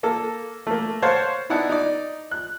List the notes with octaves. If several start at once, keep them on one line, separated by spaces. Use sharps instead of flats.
A#3 A4
A3 A#3
C5 C#5 F5 F#5 A5
B3 D#4 E4 D5 F#5 A5
D#4 D5
F#6